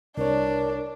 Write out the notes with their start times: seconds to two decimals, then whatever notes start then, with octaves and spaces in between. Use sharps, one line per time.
0.17 C2 D4 A#4 C#5